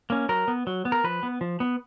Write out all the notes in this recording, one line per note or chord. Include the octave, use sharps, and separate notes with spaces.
A#3 C#4
F#3 A#4
B3
F#3
B3
A#4
F3 B4
B3
F3
B3